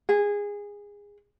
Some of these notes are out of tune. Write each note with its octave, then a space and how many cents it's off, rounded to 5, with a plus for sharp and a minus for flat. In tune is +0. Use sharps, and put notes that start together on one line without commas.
G#4 -20